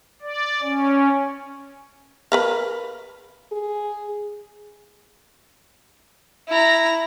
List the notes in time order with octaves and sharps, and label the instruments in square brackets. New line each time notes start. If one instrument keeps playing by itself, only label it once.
[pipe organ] D5
C#4
[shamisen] A#4 B4 F5
[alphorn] G#4
[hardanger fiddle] E4 A#5